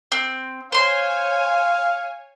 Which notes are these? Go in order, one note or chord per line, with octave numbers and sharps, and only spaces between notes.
C4
C5 C#5 F5 G#5 C6